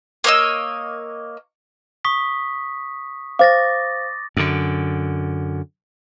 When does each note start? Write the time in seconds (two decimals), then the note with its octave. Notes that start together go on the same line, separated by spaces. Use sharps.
0.24 A#3 C#5 D#5 E6
2.05 C#6 D#6 B6
3.39 C5 F5 D6 A6 A#6
4.37 F#2 D3